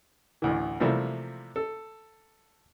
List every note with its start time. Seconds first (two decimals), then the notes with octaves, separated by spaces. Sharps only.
0.42 A1 D2 E3
0.80 C3 E3 F3 G3 A3 A#3
1.56 A4